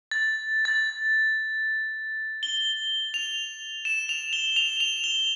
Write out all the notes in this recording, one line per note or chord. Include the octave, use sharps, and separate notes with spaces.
A6
A6
G7
F7
E7
F7
G7
F7
F7
G7